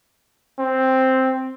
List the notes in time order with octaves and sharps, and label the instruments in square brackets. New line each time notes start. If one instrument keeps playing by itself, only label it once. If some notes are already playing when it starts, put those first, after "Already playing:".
[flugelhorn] C4